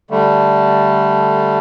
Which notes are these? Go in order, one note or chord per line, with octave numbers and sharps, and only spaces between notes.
D3 G3 A3